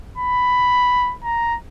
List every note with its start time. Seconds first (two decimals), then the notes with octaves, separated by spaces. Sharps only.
0.17 B5
1.24 A#5